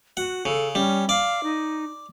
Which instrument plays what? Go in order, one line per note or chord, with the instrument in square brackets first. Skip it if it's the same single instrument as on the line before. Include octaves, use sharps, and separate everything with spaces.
[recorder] F#4 [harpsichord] F#5
[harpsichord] C#3 [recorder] A4
[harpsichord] G3 [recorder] C#4
[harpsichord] D5 [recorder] F5
[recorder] D#4